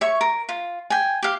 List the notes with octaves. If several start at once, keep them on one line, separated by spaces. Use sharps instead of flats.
C#5 E5 C#6
A#4
F4
G5 G#5
G4 F5